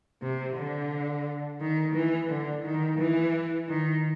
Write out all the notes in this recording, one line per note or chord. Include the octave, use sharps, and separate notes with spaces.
C3
D3
D#3
E3
D3
D#3
E3
D#3